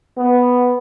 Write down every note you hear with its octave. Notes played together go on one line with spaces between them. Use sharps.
B3